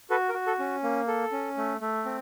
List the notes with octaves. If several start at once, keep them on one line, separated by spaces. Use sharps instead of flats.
F#4 A4 B4
A#4
F#4
A4
C#4
A#3
A4
C#4
A3
A3
C4